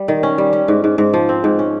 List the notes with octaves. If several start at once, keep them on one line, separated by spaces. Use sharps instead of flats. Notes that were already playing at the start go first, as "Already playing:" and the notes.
Already playing: G3
D#3
C#4
G3
C#4
G#2
G#2
G#2
F3
C4
G#2
C#4